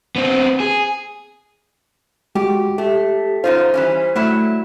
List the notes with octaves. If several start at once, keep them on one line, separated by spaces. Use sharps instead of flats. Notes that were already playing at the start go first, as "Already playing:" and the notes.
B3 C4
G#4
G#3 F#4 G4
A3 G4
F#2 D#4 F4 C5
E3 G3 C#4
F#3 G3 A3 E4